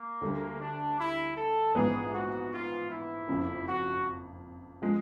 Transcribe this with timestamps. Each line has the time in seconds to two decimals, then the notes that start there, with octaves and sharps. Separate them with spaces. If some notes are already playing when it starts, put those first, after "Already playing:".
Already playing: A#3
0.21 D2 D3 G3
0.60 D4
0.98 E4
1.36 A4
1.74 A#1 G#2 E3 G#3 B3 G#4
2.14 F#4
2.52 F4
2.90 E4
3.28 F#1 F2 C#3
3.66 F#4
4.82 F3 G#3